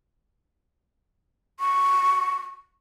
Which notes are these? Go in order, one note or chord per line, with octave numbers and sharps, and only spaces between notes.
C#6